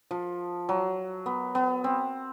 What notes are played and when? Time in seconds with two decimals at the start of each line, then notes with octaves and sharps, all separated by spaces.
0.11 F3
0.69 F#3
1.26 B3
1.55 B3
1.84 C4